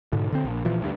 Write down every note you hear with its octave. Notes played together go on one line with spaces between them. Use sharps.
G#2 B2 D3
D3 C4
A#1
A#2 E3 F3
D2 G2